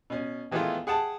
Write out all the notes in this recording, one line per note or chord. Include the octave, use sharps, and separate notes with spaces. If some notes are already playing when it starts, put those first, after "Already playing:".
B2 C#4
D#3 E3 G#3 A3 B3 F4
G#4 F#5 G5 A5